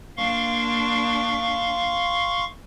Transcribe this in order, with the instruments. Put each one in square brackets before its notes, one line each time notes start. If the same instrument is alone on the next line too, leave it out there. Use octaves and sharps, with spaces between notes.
[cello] A#3 D4 [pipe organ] F5 C6 C#6